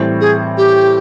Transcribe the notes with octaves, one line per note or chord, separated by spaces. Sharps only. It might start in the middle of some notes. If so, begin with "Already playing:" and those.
Already playing: A2 E3 G3 C4
G#4
G4